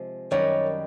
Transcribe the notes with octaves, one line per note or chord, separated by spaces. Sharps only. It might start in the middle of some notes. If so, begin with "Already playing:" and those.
Already playing: C3 F3 G#3
F#2 D#3 G3 C#5